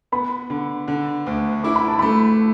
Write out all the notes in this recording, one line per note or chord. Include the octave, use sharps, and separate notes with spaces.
B3 B5
D3
D3
D2
E4 D6
B5
A5
A3 B5